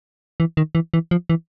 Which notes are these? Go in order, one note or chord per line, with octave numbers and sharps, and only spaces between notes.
E3
D#3
E3
E3
F3
E3